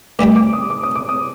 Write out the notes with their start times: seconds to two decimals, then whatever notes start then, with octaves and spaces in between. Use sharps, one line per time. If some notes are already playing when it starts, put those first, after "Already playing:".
0.19 D2 D3 G3 D4 D6
0.36 D6
0.53 D#6
0.70 D6
0.83 D#6
0.95 D6
1.09 D#6